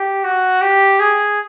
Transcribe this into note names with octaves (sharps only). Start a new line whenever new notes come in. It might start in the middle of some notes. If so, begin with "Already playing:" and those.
Already playing: G4
F#4
G4
G#4